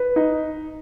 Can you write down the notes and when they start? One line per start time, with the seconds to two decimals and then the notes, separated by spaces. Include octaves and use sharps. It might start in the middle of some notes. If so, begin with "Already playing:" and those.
Already playing: B4
0.16 D#4